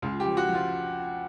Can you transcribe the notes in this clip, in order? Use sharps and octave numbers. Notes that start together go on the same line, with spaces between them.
C#2 F4
G4
F3
F#4
F3
F4